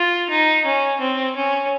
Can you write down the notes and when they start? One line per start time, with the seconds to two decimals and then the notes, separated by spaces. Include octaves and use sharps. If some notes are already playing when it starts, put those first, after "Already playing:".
Already playing: F4
0.29 D#4
0.64 C#4
1.00 C4
1.35 C#4